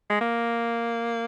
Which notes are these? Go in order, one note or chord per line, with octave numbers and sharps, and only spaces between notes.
G#3
A#3